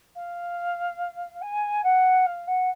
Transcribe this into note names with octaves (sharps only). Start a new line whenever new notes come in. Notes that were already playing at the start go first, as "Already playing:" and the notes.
F5
G#5
F#5
F5
F#5